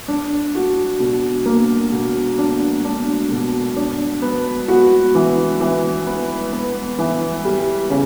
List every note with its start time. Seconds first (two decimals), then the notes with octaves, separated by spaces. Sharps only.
0.08 D4
0.55 F#4
1.00 B2
1.46 A#3
1.92 B2
2.38 D4
2.85 D4
3.30 B2
3.76 D4
4.22 B3
4.68 F#4
5.15 E3
5.60 E3
6.07 B3
6.53 B3
6.99 E3
7.45 G3
7.90 C#3